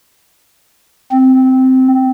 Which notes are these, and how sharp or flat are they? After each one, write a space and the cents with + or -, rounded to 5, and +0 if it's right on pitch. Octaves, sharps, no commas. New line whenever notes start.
C4 -10